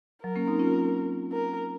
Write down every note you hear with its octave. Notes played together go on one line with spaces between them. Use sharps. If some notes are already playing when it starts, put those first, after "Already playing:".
F#3 A#4
A#3 C#4
C4 D#4
C#4 F4
A#4